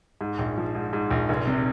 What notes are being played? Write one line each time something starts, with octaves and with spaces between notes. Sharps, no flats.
G#2
A#1
F3
G#2
G#2
A#1
F1
C3